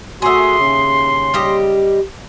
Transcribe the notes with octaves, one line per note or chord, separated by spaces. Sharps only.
A3 F#4 G#4 E5 C6
D#2 C#3
G3 G4 D#5